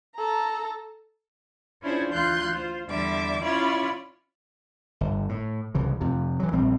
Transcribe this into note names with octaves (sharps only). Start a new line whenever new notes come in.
A4 A#5
C#4 D4 E4 F4 G#4 C5
D2 E3 F4 C6 F#6 G6
F4 C5
E2 D3 G3 E5 D6
C#4 E4 F4 C#5 D5 B5
G1
A2
C2 C#3 E3
F2 C3
E3 F#3
A#1 G3 C4